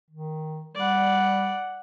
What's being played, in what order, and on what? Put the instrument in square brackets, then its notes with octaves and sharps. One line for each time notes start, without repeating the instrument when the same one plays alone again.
[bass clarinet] D#3
[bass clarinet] G3 [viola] D5 F#5